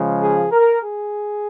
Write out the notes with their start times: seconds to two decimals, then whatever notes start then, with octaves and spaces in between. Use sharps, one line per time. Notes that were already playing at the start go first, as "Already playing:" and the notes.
Already playing: C#3 F3 G#3
0.21 G#4
0.52 A#4
0.83 G#4